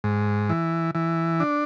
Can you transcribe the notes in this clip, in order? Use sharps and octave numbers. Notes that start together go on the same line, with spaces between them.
G#2
E3
E3
D4